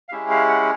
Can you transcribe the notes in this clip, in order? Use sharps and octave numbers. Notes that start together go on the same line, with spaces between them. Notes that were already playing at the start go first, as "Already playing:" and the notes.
F5
G#3 C#4 E4 G4 E5
F5
F#5